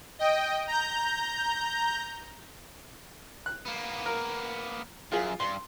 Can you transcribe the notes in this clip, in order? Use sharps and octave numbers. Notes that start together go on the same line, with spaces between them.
D#5 G5
A#5 G6
F#6
A#3 B3
A#4
F#2 F4 G#4
G2 C6